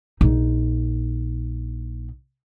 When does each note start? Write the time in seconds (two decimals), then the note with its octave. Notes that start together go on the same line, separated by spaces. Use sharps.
0.21 A#1 D#4